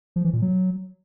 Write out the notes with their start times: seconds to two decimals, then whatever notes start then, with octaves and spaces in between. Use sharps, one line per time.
0.16 F3
0.25 E3
0.33 A#2
0.42 F#3